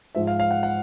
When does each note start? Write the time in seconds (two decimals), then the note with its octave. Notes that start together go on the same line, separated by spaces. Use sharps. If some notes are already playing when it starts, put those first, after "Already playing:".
0.15 G#2 F3 E5
0.27 F5
0.40 F5
0.51 F#5
0.63 F#5